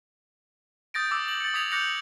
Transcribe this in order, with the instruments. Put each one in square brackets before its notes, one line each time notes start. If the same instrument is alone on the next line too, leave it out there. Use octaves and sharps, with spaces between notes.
[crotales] D#6 G6 A6 A#6 D7
D6 E6 A6
E6 F#7
A6 C#7
D#6 G#6 B6 F7 F#7
D6 F#6 G6 A#6 C#7 F#7